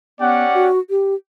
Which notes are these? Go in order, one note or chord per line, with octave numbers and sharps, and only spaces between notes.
B3 C#4 G4 D5 F#5
F#4
G4